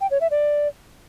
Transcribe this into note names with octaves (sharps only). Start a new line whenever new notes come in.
G5
C#5
E5
D5